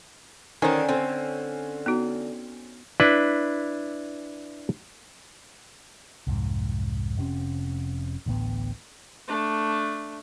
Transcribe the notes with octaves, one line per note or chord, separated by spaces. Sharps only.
D3 D#3 C#4 D4 C5 G#5
D3 C4
B3 D#4 F#4
D4 E4 B4
C2 F2 G#2
F1 C3 C#4
A1 D2 A2 B3
A3 D4